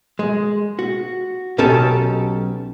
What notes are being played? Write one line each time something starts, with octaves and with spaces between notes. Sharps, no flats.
G#3
F#4
B1 B2 C#4 G4 A4 A5